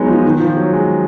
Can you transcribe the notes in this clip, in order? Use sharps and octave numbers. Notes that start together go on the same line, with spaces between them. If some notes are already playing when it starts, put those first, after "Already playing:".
Already playing: F#3 G#3 B3 D#4
F3
D#3
F3
F#3
G#3